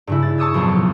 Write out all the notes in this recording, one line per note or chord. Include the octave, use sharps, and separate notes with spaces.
G2 C#3 E4
A6
A5 C#6 D#6 E6 G#6
B1 F2 A#2